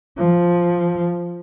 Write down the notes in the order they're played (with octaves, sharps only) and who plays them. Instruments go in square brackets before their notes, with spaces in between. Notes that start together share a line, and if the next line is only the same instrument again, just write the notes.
[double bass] F3